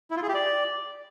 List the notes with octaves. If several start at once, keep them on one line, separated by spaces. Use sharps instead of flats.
E4
F4
G#4
G4
D5